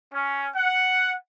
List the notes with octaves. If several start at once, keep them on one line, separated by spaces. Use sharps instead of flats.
C#4
F#5